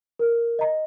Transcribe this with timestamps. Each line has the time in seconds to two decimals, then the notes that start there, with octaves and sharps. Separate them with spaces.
0.19 A#4
0.59 D#5 A#5